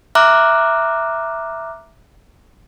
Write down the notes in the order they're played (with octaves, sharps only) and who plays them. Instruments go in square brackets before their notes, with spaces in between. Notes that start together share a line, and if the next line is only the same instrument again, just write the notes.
[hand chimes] E5 A#5 D6 F6 F#6